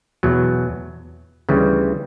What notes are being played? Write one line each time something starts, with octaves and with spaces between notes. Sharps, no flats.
E2 B2 F#3
D2 C#3 E3 G3